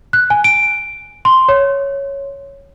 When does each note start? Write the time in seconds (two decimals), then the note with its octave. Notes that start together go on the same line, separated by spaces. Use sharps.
0.13 F#6
0.30 G#5
0.44 D7
1.25 C6
1.49 C#5